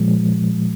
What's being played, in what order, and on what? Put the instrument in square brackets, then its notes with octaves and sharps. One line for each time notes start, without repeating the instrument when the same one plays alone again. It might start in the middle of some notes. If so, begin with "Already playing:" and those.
Already playing: [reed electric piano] A#2 F3 G#3